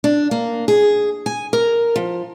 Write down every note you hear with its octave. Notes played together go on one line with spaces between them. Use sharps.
D4
A#3
G#4
G#5
A#4
F3